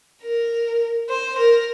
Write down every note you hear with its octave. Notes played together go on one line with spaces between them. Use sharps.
A#4
C5
A#4